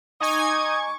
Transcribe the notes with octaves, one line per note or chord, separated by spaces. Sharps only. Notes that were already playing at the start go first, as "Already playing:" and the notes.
D#4 D#5 G#5 C#6 D6 G#6